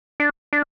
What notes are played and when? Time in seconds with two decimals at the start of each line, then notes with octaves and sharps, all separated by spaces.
0.20 D4
0.53 D4